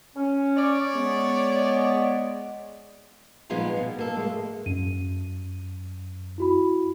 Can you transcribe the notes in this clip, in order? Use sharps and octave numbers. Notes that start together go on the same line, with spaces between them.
C#4
C#5 D5
G#3 B3
A#2 F3 G#3 B3 D#4 F4
B2
A#3 A4
G#3 A3
F#2 D#7
E4 F#4 B5